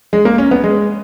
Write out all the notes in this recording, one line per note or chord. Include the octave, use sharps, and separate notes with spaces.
G#3
A#3
C#4
B3
G#3